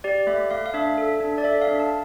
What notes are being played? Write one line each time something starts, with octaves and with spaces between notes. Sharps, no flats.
G4 D5
A3 E5
A3 F5
F5
D4 E5
A4
D4
D5
A4 E5
F5
D4
A5